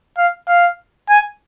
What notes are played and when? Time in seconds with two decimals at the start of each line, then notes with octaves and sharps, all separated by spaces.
0.18 F5
0.48 F5
1.10 G#5